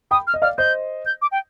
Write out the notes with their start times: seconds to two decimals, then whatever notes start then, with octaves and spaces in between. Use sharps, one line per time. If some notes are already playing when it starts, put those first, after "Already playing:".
0.11 G5 B5 D#6
0.27 F6
0.34 D#5
0.42 D5 F5 F6
0.58 C5 D#5 G6
1.06 G6
1.22 D6
1.32 G5